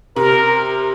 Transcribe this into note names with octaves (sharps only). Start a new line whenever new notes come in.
C3 A#4